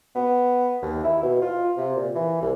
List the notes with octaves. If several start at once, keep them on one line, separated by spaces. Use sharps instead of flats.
B3
D#2
E4
B2
F4
C3
A#2
E3
C2